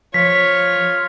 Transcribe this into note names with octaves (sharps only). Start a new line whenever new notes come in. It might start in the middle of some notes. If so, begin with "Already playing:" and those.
F3 F4 C#5 B6